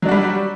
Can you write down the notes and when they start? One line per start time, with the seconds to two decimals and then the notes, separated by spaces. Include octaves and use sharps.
0.02 F#3
0.05 D4
0.08 F#4
0.11 G3